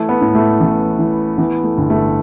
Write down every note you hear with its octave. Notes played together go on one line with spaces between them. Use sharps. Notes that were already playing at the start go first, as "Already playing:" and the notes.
Already playing: E3 A3
B3
A2
A3
A1
E3
E3 B3
A3
G1
A3